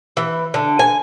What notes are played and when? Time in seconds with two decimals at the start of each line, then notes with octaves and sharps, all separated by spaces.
0.17 E3
0.54 D3
0.79 G#5